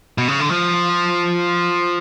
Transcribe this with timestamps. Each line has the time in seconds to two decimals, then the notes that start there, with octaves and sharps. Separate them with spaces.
0.18 B2
0.28 C#3
0.40 D3
0.50 F3